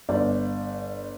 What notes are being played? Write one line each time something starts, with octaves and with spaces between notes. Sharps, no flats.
G1 D5